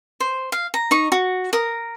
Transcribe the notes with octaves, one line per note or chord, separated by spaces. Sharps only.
C5
F5
A#5
D#4 C#6
F#4
A#4 D#6